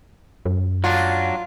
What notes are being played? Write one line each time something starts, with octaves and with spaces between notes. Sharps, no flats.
F#2
F#3 D4 F4